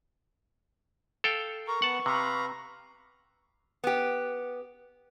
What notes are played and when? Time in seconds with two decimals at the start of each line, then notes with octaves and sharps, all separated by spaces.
1.24 A4 F5 G5
1.67 A#4 A#5 C#6
1.82 B3 F#5 A5
2.06 C3 B4 F5 A#5
3.84 B3 G4